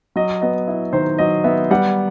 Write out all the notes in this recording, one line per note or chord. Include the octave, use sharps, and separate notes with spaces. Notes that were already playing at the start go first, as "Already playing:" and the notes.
F#3 D#5
B3 D#5
E4
D#3 C5
F#3 D#5
B3 E5
G3 F#5